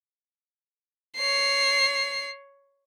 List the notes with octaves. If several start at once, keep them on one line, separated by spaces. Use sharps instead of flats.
C#5 C7